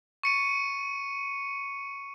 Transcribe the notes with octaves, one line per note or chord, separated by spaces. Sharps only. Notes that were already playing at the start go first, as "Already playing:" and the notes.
C#6 C#7 D#7